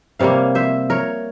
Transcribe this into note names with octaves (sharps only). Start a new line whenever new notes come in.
C3 G3 A#3 C#5 F5
C5 E5
A#4 C#5